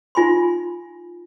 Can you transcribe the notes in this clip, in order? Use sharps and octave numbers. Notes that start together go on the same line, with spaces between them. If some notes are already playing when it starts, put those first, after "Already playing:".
D#4 F4 G#5 B5 C6